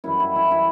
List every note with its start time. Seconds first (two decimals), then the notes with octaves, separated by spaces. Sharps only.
0.04 F#2 E3 G3 E4
0.20 E4
0.36 E4
0.51 E4